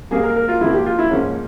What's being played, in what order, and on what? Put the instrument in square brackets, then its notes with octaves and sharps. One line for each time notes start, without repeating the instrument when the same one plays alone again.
[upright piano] G#2 G3 A#3 G#4
A#4
A#4
F4
G#2 F3 A#3 E4
G4
F4
E4
G#2 F3 A#3 C#4